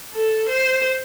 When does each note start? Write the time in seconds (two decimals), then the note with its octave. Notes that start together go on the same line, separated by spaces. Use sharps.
0.14 A4
0.49 C5